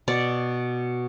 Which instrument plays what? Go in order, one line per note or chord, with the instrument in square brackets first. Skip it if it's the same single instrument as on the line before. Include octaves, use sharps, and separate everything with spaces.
[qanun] B2 D5